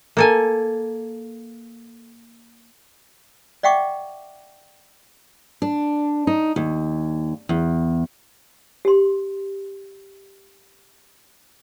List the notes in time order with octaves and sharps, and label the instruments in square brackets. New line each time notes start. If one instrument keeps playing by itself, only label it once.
[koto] A#3 A4 G#5
[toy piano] D5 E5 F#5 G5 C#6 D6
[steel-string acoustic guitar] D4
D#4
D#2
E2
[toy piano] G4 C6